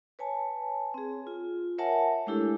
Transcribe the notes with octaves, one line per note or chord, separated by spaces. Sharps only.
B4 C#5 G#5 A5
C4 G#4
F4
A#4 C#5 E5 F#5 G#5 A5
G#3 A3 D4 E4 G4 A4